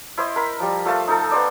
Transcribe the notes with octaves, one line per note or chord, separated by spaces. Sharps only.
E4 C5 D#5
A#4 B5
F3 G3
F3 A3 F5 A5
D#4 A4
B3 C5 D5